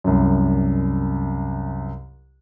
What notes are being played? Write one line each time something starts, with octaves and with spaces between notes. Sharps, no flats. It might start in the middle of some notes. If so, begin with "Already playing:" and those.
C2 F#2